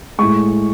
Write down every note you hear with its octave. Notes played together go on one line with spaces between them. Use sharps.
A2 G#3 C#6